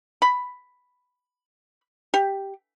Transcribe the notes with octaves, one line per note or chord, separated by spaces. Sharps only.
B5
G4